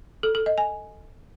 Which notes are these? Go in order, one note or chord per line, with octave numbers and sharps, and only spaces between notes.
A4
A4
D#5
G#5